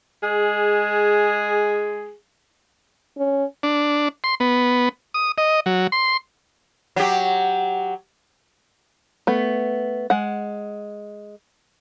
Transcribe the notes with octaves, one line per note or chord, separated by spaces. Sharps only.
G#3 G#4
C#4
D4
C6
B3
D#6
D#5
F#3
C6
F#3 G4
A3 B3
G#3 F#5